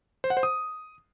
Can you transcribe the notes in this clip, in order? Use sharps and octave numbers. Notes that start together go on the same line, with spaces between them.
C5
F#5
C5
D#6